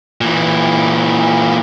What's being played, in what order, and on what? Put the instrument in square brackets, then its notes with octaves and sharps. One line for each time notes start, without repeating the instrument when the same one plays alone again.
[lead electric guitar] A#2 E3